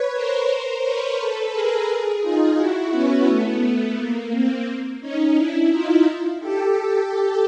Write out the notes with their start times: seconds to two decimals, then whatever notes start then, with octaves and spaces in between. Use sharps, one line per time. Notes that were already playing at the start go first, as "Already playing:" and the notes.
Already playing: B4 C#5
0.13 A#4 C5
0.47 A#4 C5
0.82 B4 C#5
1.17 A4 B4
1.52 G#4 A#4
1.86 G#4 A#4
2.21 D#4 F4
2.56 E4 F#4
2.91 B3 C#4
3.27 A3 B3
3.62 A3
3.96 A#3
4.31 A#3 C4
5.00 C#4 D#4
5.35 D4 E4
5.70 D#4 F4
6.40 G4 A4